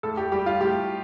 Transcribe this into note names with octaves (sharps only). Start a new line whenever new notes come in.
A2 A4
G4
G3 G4
F4
A2 G4